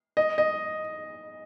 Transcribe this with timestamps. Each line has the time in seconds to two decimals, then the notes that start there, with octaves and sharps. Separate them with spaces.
0.17 D#5
0.38 D#5